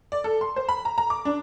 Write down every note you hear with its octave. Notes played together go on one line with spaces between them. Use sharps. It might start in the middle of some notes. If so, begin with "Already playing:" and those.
D5
A4
C6
C5
B5
A#5
A#5
D6
D4